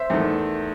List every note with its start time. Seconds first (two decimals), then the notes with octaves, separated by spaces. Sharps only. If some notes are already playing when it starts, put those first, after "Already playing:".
Already playing: C5 E5
0.10 E2 D#3 A3